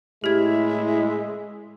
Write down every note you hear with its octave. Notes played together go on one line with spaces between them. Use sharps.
A2 G#3 E4 G4 E5 G#6